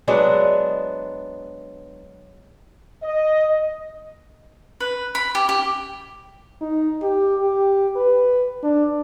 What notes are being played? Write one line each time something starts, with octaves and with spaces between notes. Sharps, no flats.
F#3 G#3 B3 D4
D#5
B4
B5
G4
G4
D#4
G4
G4
B4
D4